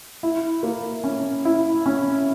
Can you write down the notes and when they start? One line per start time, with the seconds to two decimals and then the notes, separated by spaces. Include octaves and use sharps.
0.23 E4
0.63 A#3
1.04 C#4
1.45 E4
1.86 C#4